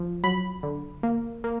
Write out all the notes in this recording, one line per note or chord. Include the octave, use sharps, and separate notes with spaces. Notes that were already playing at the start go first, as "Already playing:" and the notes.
Already playing: F3
F#3 B5
D3
A#3
A#3